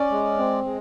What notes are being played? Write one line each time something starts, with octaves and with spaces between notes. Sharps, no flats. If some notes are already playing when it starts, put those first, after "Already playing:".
Already playing: C#4 D5
G#3
C4
G#3